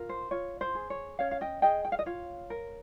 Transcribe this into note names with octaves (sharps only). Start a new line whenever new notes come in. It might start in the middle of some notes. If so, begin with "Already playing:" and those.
Already playing: F4 A#4
C5
F4 C#5
C5
G#4
C#5
C#4 C#5 F5
F5
D#5 G5
G#4 D#5 G5
G5
F5
D#5
F4 C#5 F5
A#4